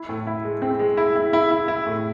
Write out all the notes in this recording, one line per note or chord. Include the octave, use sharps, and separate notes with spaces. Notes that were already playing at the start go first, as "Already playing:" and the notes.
Already playing: E4
A2
E4
G#3
C4
G#3
E4
E4
E4
E4
E4
A2